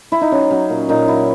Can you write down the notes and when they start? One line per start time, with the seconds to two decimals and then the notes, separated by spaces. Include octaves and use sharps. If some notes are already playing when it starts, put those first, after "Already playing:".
0.12 E4
0.21 D#4
0.32 F#3 C#4
0.51 F#3 C#4
0.70 A#2
0.89 A#2 D#4
1.08 F#3 E4